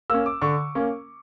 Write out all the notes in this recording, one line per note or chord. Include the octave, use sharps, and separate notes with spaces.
A#3 C#4 E6
D6
D3 C#6
A#3 C#4